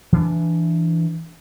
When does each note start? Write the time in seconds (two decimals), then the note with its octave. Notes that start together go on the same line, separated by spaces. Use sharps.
0.13 E3 D4